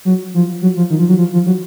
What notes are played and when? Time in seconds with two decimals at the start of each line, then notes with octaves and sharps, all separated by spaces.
0.05 F#3
0.34 F3
0.62 F#3
0.77 F3
0.90 D#3
0.99 F3
1.09 F#3
1.18 F3
1.33 F3
1.46 F#3